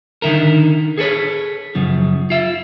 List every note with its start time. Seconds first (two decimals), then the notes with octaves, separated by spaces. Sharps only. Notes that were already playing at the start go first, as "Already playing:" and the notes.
0.22 D3 D#3 E4 A#4
0.98 G#4 A4 B4 C#5
1.75 F#2 C#3 F3
2.30 F4 E5